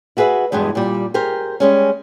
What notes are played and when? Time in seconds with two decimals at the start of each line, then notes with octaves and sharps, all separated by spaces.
0.17 E4 F#4 G#4 B4 E5
0.52 E2 G2 B2 G#3
0.75 A#2 G3
1.14 G4 G#4 A#4 C5
1.60 G3 G#3 C#4